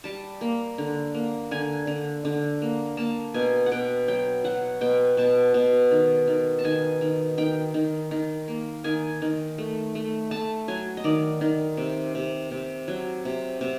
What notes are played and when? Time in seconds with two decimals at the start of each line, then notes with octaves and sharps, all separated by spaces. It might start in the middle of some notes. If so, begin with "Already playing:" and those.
0.04 G3 A5
0.41 A#3
0.78 D3
1.15 A#3
1.51 D3 G#5
1.87 D3
2.25 D3
2.62 A#3
2.97 A#3 A5
3.34 B2 G#5
3.66 F#5
3.71 B2 G5
4.08 F#3 G5
4.44 F#3 F#5
4.81 B2 G5
5.17 B2 A5
5.54 B2
5.91 D#3
6.27 D#3
6.59 A5
6.64 D#3 G#5
7.01 D#3
7.38 D#3 G5
7.74 D#3
8.11 D#3
8.48 A#3
8.84 D#3 G#5
9.22 D#3
9.58 A3
9.95 A3
10.31 A3 A5
10.68 F#3 G#5
10.97 D#5
11.04 D#3 D5
11.41 D#3
11.77 C3
12.15 C3
12.51 C3
12.88 F#3
13.25 C3
13.61 C3